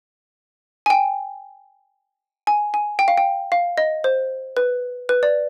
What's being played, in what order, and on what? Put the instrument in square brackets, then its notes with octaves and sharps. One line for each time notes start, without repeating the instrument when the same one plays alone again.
[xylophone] G#5
G5
G#5
G#5
G5
F5
G5
F5
D#5
C5
B4
B4
D5